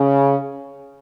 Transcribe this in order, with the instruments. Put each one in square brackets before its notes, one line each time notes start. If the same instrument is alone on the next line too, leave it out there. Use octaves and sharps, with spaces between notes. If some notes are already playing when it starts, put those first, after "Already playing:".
Already playing: [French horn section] C#3